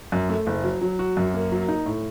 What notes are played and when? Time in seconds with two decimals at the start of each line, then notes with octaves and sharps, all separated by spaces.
0.12 F#2
0.29 A3
0.47 F#1
0.64 F#3
0.82 F#3
0.99 F#4
1.17 F#2
1.34 A#3
1.52 F#3
1.68 D#4
1.86 A2